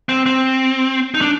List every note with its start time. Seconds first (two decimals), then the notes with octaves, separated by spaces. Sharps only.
0.09 C4
0.26 C4
1.14 D#4
1.21 D4